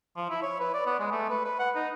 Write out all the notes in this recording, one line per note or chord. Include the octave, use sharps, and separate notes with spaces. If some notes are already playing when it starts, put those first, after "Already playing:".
F3
E4
C#5
B4
D5
B3
G#3
A3
B4
B4
F#5
D#4